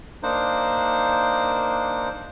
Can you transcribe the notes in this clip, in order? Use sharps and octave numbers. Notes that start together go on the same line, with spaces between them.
A#3 D4 D#4 C5